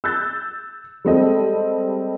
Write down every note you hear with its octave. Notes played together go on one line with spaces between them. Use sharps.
E6 F#6 G6 A6
G3 G#3 C4 A4 D#5